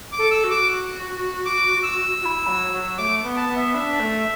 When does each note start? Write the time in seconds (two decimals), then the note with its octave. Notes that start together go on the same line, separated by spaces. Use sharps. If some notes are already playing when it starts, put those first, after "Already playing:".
0.12 D6
0.19 A4
0.31 E6
0.44 F#4
0.50 D6
1.46 D6
1.83 E6
2.22 F#4
2.25 E4
2.47 F#3
2.72 F#3
2.98 A3 D6
3.23 B3
3.37 A5
3.49 B3
3.56 E5
3.74 D4 E5
4.00 A3